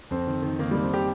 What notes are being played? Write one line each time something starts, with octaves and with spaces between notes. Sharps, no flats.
F2 C4
D#3
D#3
D#3 A#3
G3
D#3
C4
D#3 G4